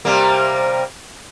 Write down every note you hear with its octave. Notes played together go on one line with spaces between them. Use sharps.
C3 G3 A#3